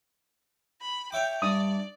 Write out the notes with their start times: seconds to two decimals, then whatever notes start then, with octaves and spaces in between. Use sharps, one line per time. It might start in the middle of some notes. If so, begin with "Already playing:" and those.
0.81 B5
1.12 C#5 E5 G5 D6
1.42 G2 D5 D#6